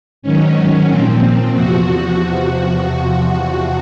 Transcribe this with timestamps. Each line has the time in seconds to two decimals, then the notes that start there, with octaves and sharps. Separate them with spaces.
0.22 G#2 D#3 F#3 C#4
0.88 A#2 F3 C4
1.53 E2 C3 F3 F#4